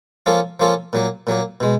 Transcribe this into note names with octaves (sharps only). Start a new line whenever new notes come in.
F3 A#3 C#4 F4 A4
F3 A#3 C#4 F4 A4
A#2 F#3 A#3
A#2 F#3 A#3
B2 G#3